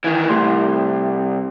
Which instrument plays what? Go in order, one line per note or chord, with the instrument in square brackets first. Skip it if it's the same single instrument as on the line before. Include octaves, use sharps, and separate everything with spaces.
[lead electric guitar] D#3 E3
[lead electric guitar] C2 [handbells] A3 G4 C6